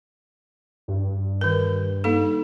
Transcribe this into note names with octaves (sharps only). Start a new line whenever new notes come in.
G2
D#3 A#4
A#3 D#4 A4